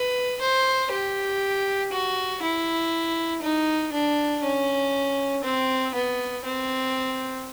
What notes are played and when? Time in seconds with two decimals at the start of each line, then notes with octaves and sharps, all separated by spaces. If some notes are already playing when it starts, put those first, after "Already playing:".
Already playing: B4
0.41 C5
0.91 G4
1.92 F#4
2.42 E4
3.42 D#4
3.93 D4
4.44 C#4
5.44 C4
5.95 B3
6.45 C4